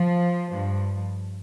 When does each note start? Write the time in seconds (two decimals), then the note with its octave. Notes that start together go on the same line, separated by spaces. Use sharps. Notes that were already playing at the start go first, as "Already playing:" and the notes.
Already playing: F3
0.50 G2 F3